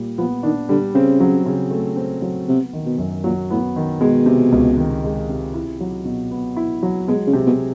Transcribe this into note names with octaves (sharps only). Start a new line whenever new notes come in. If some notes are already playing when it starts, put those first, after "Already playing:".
Already playing: A#2 G3
F3 B3
D#3 D4
D3 G3
C#3 C4
F#3
C#3
A3
C4
F#3
C3 B3
D#3
B2
F#2
A#2 F#3
A2 B3
D#3
B2 G#3
C3
C#2
D#3
G#3
C3
E4
F#3
B2
B3
E4
F#3
B2 G#3
C#3
C3
B2